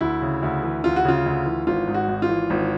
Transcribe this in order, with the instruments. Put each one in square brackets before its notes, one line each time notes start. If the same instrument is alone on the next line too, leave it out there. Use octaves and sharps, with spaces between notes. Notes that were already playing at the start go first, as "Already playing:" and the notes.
[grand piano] D2 E4
C#3
D2
E3
D2 F4
F#4
C#3 F4
D2
E3
G#1 F4
G#2
F#4
G#1
F4
E3
G#1